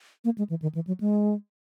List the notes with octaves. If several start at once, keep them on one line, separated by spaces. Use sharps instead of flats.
A#3
G#3
E3
D#3
E3
F#3
G#3